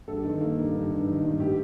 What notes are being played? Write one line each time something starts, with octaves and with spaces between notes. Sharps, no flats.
G2 A4
D#3
A#3
G2
G2
G2
D#3
G2
A2 G4